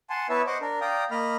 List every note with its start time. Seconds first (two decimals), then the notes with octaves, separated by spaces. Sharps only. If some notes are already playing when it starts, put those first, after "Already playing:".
0.10 F#5 G#5 A5 C6
0.29 B3 E4 B4 C#5 E5 A5
0.47 C5 D#5 F#5 C#6 D6
0.61 D4 A#4
0.81 D5 F5 G5 A#5 D#6
1.11 A#3 D#5 B5 F6